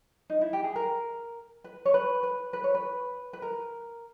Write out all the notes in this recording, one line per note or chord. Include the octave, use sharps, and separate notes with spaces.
D#4
E4
G4
G#4
A#4
B4
C#5
B4
B4
B4
C#5
B4
B4
A#4